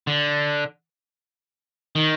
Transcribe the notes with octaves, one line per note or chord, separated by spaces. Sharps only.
D3
D#3